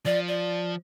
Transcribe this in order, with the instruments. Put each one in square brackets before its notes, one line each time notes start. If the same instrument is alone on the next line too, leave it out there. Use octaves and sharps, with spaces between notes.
[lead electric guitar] F3 [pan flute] D5
[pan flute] D5